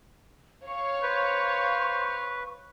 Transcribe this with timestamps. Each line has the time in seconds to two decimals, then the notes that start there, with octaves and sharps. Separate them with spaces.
0.67 C#5 F5 C#6
1.03 B4 C5